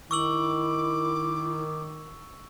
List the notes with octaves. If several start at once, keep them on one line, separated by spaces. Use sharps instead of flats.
D#3 E4 C#6 D6 E6 F#7